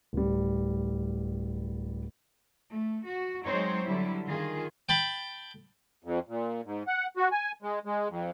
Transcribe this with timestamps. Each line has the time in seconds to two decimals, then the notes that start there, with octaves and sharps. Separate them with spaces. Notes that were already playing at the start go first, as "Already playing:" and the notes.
0.13 D1 G3
2.74 A3
3.07 F#4
3.45 F#3 G#3 C4 D#4 C5 C#5
3.86 D3 F#3 G3 E4
4.26 D#3 F4 G#4
4.89 G5 A5 B5
6.04 F2
6.28 A#2
6.65 G#2
6.87 F#5
7.17 F#4
7.32 G#5
7.62 G#3
7.85 G#3
8.09 F2